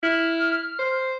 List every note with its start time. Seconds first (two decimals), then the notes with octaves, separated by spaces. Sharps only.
0.03 E4 F6
0.79 C5